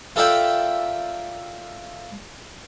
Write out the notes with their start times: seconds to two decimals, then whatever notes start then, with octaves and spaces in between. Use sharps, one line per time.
0.16 F4 A4 A#4 D5 E5 G5